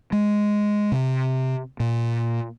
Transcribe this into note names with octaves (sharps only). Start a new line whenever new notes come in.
G#3
C3
A#2